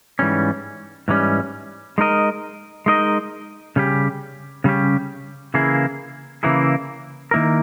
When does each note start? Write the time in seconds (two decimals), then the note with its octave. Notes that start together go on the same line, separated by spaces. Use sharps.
0.19 G#2 E3 G3 C#4
1.08 G#2 E3 G3 C#4
1.98 G#3 D#4 A#4 D#5
2.86 G#3 D#4 A#4 D#5
3.76 C#3 G3 C#4 G4
4.64 C#3 G3 C#4 G4
5.54 C#3 E3 A#3 E4 G#4
6.43 C#3 E3 A#3 E4 G#4
7.31 D#3 A#3 E4 A#4